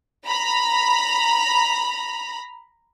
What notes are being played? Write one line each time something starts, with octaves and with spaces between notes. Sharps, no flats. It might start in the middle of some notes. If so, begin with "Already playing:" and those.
A#5 B5